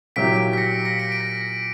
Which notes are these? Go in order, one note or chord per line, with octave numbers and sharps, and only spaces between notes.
A#2 F#3 A#3 E4 G4 B6 D7
B6 D7
B6
A#6 C#7
A#6 C#7
B6 D7
D7
A#6 C#7
A#6 C#7